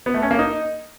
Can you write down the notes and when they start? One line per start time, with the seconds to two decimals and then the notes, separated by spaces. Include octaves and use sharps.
0.06 B3
0.14 A3
0.23 C#4
0.31 A#3
0.39 D#4